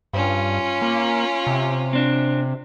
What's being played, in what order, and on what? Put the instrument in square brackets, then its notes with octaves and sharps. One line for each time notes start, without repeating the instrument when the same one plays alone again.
[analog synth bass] G2 [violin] C#4 F4
[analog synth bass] A#3
C3
[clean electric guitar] C4 D4